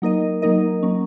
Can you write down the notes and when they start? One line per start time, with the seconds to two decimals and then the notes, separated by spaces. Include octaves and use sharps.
0.02 F#3 A#3 D#4 A#4 D#5
0.42 F#3 A#3 D#4 A#4 D#5
0.83 F#3 A#3 C#4